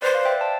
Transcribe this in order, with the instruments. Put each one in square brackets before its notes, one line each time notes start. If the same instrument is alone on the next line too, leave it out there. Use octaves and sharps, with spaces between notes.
[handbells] B4 D5 [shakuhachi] C5
[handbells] D5 F5
E5 G5
A5